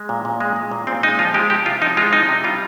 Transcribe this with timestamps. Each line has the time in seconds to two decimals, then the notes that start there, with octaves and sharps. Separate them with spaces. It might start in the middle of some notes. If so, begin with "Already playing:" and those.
Already playing: G#3
0.09 A#2
0.25 A#2
0.40 G#3
0.56 G#3
0.72 A#2
0.87 A#2 C4
1.03 G#3 D#4
1.19 F3 F4
1.34 G#3 G4
1.50 C3 G4
1.66 C3 F4
1.82 F3 D#4
1.97 G#3 F4
2.13 C3 D#4
2.29 C3
2.44 G3 F4